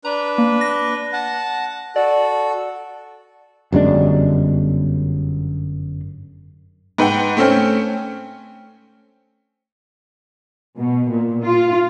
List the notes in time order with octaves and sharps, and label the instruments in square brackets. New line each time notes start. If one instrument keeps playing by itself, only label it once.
[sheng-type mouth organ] D4 B4 [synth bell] A#5
[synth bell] A#3
A#6
[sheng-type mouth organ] F#5 A5
[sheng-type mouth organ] F#4 A4 [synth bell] D5
[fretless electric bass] G1 F#2 G#3 D4
[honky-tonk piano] G#2 B4 F#5 G5
A3 C4 C#4 G5
[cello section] B2
A#2
F4